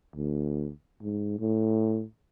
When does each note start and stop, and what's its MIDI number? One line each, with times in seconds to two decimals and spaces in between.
0.16 0.71 38
1.02 1.39 44
1.40 2.04 45